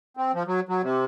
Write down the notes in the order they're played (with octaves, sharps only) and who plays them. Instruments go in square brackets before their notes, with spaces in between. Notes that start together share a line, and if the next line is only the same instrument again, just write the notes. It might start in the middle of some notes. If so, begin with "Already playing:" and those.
[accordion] C4
F3
F#3
F#3
C3